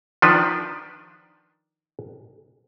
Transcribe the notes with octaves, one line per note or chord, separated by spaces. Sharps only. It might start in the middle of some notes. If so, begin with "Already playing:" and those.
D#3 F3 D4 B4